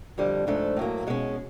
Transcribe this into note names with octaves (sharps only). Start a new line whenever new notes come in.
F2 D3 G3
G#2 F3 A3 D4
A2 F#3 A#3
B2 G#3 C#4